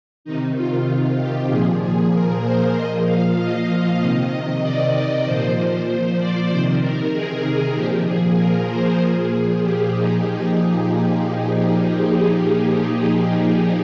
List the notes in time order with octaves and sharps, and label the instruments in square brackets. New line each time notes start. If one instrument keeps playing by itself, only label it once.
[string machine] C3 D#3 D#4
F4
G4
A#2 F3 G#4
G#4
A#4
C5
A#2 F3 D#5
F5
D#5
C3 D#3 D#5
D5
A#2 F3 C5
D5
C3 D#3 C5
A#4
G#4
A#2 F3 G4
G#4
A#4
C5
A#2 F3 G#4
G4
D#4